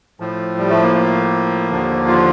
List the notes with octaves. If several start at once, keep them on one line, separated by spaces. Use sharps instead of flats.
A2 F3
G3
A3
A#3
A#3
D#2 D3 F3
F4